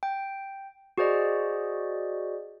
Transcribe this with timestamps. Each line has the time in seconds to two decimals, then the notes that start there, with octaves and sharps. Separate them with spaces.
0.03 G5
0.98 F#4 G#4 C5 D5 D#5